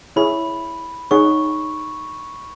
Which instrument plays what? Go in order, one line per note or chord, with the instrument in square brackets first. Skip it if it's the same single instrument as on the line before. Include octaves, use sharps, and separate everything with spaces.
[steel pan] E4 G#4 C#5 E5 [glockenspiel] B5
[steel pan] D#4 G#4 C#5 F#5 [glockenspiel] C#6